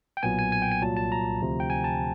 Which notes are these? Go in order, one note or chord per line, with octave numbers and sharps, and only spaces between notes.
G5
B1 A#2 F#3 B3 G#5
G#5
G#5
G5
G#5
C2 A#2 F#3 A5
A5
A#5
D2 C3 F3
G5
G#5
A5